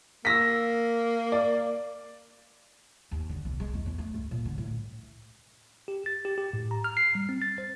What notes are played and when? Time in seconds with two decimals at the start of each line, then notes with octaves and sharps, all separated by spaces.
0.25 A#3 E6 A#6 B6
1.32 D5
3.11 D#2
3.29 D3
3.45 B1
3.60 G#3
3.73 E2
3.86 E2
3.98 A3
4.14 C#2
4.31 A#2
4.45 D3
4.58 A2
5.88 G4
6.06 A6
6.25 G4
6.38 G4
6.53 A2
6.71 A#5
6.84 F6
6.97 C7
7.15 G3
7.29 C4
7.42 A6
7.58 C5